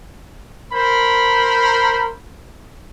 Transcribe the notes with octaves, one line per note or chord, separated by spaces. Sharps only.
A#4 C5 B5